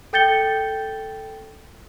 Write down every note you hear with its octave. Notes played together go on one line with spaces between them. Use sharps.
A4 G5 G6 A6 C#7 G7